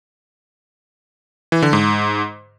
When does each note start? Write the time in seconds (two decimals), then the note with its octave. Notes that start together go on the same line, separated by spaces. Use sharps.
1.52 E3
1.62 D3
1.73 G#2